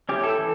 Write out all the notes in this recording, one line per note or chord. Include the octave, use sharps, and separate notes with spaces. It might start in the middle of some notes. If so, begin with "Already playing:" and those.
C#4 E4 G4
A4
E3